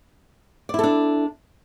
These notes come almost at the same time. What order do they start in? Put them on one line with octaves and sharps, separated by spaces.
D5 E4 A4 D4